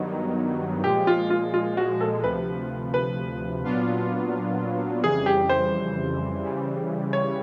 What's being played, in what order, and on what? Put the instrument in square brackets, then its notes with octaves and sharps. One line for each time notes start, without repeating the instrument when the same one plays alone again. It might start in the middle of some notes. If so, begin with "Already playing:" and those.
Already playing: [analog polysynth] G2 D#3 F#3 B3 D#4
[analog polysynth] A#2 F3 G#3 [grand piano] G4
[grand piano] F4
F4
F4
F#4
A4
[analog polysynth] D2 C3 F3 [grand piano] B4
[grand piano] B4
[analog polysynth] A#2 F#3 B3 D4 F4
[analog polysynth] F2 C#3 E3 G3 [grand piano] G#4
[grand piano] G4
C5
[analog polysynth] C#3 E3 G3
[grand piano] C#5